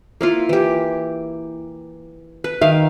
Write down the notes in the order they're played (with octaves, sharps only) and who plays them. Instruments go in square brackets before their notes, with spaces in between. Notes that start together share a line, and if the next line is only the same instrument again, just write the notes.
[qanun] A#3 E4 F4
E3 G4
B4
[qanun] D#3 F5 [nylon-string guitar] E5